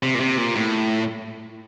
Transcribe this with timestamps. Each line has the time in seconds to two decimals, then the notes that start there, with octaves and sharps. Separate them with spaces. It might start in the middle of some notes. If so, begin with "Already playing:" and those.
0.03 C3
0.15 A#2
0.20 C3
0.37 A#2
0.55 A2